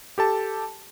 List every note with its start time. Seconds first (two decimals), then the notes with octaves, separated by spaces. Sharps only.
0.18 G4 A4 A5